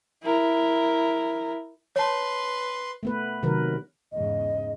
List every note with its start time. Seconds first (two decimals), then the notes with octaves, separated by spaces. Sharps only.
0.23 E4 A#4
1.96 B4 C#5 A5 C6
3.03 A3 B3 B4
3.43 C3 D#3 F#3 A#4 B4
4.12 E2 G#2 C#3 D#5